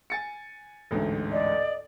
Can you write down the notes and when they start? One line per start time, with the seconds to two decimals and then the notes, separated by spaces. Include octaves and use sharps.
0.10 G#5 A6 C#7
0.91 A1 D2 G#2
1.32 D5 D#5